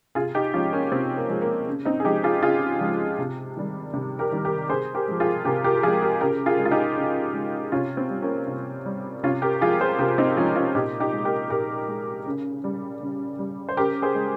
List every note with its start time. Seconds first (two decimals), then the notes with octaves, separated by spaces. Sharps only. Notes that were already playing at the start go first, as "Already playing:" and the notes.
0.15 C3 F4 G#4
0.35 D#4 G4
0.53 F3 G#3 C#4 F4
0.72 A#3 C#4
0.91 C3 C4
1.17 A#3
1.29 F3 G#3
1.41 A#3
1.68 C#3
1.85 C4 D#4
2.00 G#4
2.05 F3 G#3 D#4 G4
2.24 F4 G#4
2.42 C#3 F4 G#4
2.81 F3 G#3
3.18 C3
3.57 D#3 G3
3.94 C3
4.19 G4 A#4
4.32 D#3 G3
4.45 G4 A#4
4.69 C3 G#4 C5
4.95 G4 A#4
5.08 F3 G#3
5.20 F4 G#4
5.45 C3 G4 A#4
5.64 G4 A#4
5.83 F3 G#3 F4 G#4
6.02 G4 A#4
6.21 C#3 G4 A#4
6.46 F4 G#4
6.59 G#3
6.66 F4
6.71 D#4 G4
6.97 C#3
7.34 G#3
7.72 C3 C#4 F4
7.97 C4
8.10 G3
8.22 A#3 C#4
8.48 C3
8.86 G3
9.23 C3 C#4 F4
9.42 G4 A#4
9.61 F3 G#3 F4 G#4
9.80 G#4 C5
9.99 C3 G4 A#4
10.18 C4 D#4
10.37 F3 G#3 C#4 F4
10.56 C#4 F4
10.75 A#2 D#4 G4
11.00 D#4 G4
11.13 G#3
11.25 G4 A#4
11.50 A#2 G4 A#4
11.88 G#3
12.26 C#3
12.64 G3
13.02 C#3
13.39 G3
13.69 C5
13.77 C#3 G4 A#4
14.02 G#4 C5
14.15 G#3